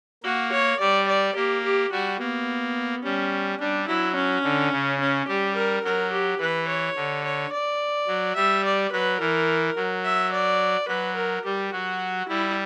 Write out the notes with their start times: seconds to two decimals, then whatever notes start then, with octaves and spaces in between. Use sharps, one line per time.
0.24 A#3 F#4
0.52 C#5
0.79 G3 D5
1.07 D5
1.35 A#3 G4
1.64 G4
1.91 G3 F#4
2.20 A#3 B3
3.03 G3 C#4
3.60 G3 D4
3.88 F#3 E4
4.15 C#4
4.44 D3
4.72 C#3
5.00 C#4
5.27 G3 G4
5.56 A#4
5.84 F#3 A#4
6.12 G4
6.39 E3 B4
6.68 C#5
6.96 D3
7.24 C#5
7.52 D5
8.08 F#3
8.35 G3 E5
8.65 D5
8.92 F#3 B4
9.20 E3 A#4
9.76 F#3
10.04 E5
10.32 D5
10.88 F#3 B4
11.16 A#4
11.44 G3 G4
11.72 F#3 F#4
12.28 G3 E4